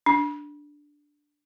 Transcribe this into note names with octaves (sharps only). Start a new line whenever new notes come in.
D4